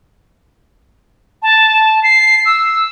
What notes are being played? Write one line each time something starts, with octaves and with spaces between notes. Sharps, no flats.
A5
C7
E6